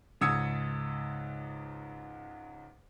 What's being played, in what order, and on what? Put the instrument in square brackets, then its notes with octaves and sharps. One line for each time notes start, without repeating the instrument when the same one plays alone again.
[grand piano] C#2 G#2 D#6 E6 G#6 C#7